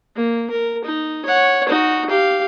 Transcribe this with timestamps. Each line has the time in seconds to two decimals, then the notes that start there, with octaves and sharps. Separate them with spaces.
0.16 A#3
0.51 A#4
0.84 D#4
1.26 C#5 F#5
1.69 D#4 F#4
2.10 G4 F5